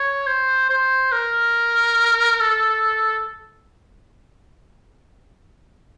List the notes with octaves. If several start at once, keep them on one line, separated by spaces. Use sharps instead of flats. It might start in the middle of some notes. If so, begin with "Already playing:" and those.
Already playing: C#5
C5
C5
A#4
A4